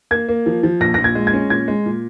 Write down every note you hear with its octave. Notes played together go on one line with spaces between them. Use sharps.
A#3 G#6
A#3
F3
F3
A#1 A#6
A#1 A#6
G#6
G#3
G#6
C#4
A#2 G#6
G#3
A#2